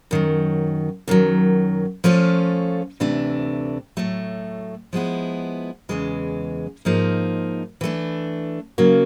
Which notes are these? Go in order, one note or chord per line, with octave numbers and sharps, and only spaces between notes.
F#2 D#3 F#3
F#2 D#3 F#3
F3 A3 C#4 F4 A4
D2 C3 E3 A3 D4
A2 F#3 A3
F3 G#3 B3 E4
E2 C#3 E3 G#3
G#2 F3 A#3 D#4
E3 A3 D4
C#3 F#3 A#3